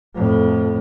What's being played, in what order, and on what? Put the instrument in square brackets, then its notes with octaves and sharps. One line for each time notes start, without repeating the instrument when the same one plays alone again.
[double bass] F2 A2